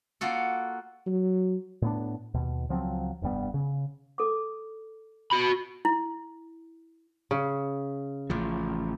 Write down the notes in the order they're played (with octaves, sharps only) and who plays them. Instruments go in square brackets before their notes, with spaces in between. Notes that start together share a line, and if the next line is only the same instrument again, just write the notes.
[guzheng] A#3 F4 F#4 A4
[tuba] F#3
[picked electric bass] A2 B3 D4
D#2 B2
C#2 F3 F#3 C4
F1 G2 G3 B3
C#3
[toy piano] A4 D6
[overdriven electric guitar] F#4 B5
[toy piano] E4
[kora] C#3
[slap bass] A1 F3